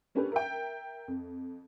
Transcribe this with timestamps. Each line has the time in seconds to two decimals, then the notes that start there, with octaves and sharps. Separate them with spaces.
0.15 A#3 C#4 D4 G4 A4 B4
0.32 A#4 E5 G5
1.08 F2